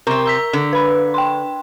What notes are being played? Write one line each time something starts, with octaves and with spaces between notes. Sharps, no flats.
C3 C4 A#4 A#5 C#6
A#5 E6 B6
D3
B4 B5
G5 C6